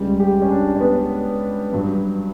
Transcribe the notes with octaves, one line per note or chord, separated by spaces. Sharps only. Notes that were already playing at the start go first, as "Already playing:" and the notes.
Already playing: C#2 C#3 G3
G4
C#4
D4
C#4
B3
G2 F#3